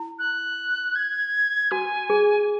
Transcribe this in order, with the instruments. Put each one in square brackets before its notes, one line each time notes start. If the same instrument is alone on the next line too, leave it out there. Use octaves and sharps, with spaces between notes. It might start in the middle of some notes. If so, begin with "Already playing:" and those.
Already playing: [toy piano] E4
[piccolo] F#6
G#6
[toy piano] F#4 [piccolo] G#5
[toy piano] G#4